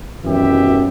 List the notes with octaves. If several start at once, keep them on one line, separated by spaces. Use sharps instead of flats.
G#1 F#2 B2 E3 G4 E5